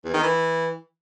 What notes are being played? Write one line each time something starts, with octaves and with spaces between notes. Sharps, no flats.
E2
D#3
E3